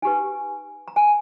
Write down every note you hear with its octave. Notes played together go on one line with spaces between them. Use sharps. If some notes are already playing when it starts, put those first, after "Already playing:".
D#4 G4 B4 G#5
A#5
G#5